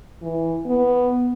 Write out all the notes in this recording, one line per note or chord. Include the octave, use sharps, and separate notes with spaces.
E3
B3